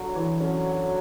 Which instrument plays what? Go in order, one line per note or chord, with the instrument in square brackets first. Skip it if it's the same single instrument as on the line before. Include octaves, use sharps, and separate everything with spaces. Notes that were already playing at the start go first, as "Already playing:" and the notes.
Already playing: [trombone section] D3 F#3
[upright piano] E3
[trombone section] D3 F#3 [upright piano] C#4
[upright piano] F#4